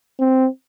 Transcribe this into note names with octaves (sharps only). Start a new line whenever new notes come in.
C4